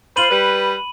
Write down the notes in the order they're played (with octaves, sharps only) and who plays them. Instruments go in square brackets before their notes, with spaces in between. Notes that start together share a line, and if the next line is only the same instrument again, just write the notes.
[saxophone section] F4 C5 [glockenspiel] B5 D#7 F#7
[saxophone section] G3 B4